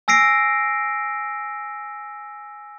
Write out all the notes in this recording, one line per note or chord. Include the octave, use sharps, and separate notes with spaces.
G#5 E6 A#6 C7 D7